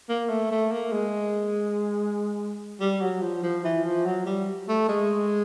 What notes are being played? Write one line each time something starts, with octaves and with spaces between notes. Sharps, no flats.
A#3
A3
A3
A#3
G#3
G3
F#3
F3
F3
E3
F3
F#3
G3
A3
G#3